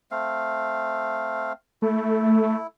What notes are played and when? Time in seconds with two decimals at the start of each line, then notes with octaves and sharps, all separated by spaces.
0.11 A3 C4 F5
1.82 A3 E4